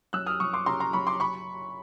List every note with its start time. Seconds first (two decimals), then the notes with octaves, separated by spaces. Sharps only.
0.13 F#2 E6 F#6
0.27 D#6 F6
0.40 F#2 C#6 D#6
0.53 C6 D6
0.66 C#3 A#5 C6
0.80 A#5 C6
0.93 F#2 B5 C#6
1.07 C6 D6
1.20 B5 C#6